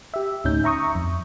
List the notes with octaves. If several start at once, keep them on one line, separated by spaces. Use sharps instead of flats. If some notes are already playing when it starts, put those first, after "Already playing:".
G4 E5
D2 A2 C#4 D#4 G6
E5 A#5 C#6 D#6
F2